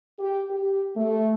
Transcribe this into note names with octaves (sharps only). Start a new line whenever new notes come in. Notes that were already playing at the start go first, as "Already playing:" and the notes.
G4
G4
A3